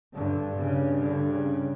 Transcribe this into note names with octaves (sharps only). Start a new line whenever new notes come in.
G2 D3
C#3
D3
C#3